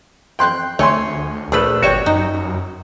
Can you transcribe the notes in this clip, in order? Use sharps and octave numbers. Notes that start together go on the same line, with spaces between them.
G5 C6 F#6
D2 A3 C#5 G#5 C6
A#1 A3 G#4 B4
G1 G3 F#4 C#5 G5
F#2 D#4